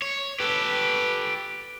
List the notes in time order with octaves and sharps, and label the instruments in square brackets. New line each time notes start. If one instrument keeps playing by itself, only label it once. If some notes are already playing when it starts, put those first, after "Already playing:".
[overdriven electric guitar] C#5
[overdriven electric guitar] G4 A4 [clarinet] B4